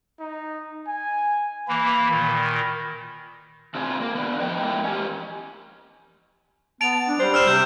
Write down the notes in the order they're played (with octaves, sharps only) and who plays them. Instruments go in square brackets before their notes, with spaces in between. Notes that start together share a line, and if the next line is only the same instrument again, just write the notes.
[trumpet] D#4
G#5
[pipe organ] E3 A#3 [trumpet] B5
[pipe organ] A#2 D#3
[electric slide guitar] C3 C4 D4 F4 G#4
A#3
B3 D4
A2 F3 B3 D#5 G5
G#3 B3 D4 E4 F4 A#4
C#4 G4
[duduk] B3 [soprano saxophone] A5 [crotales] D7 F7
[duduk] D4
[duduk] G3 [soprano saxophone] C5
[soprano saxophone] C5 [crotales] E6 F6 E7
[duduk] C3 [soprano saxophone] G4 [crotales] G6